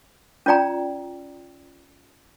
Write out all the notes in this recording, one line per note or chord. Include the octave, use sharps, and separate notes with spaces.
C#4 F4 D5 G5 A#5